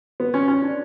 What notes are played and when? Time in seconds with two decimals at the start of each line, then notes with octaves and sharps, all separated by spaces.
0.20 B3
0.34 C#4
0.48 C#4
0.62 D4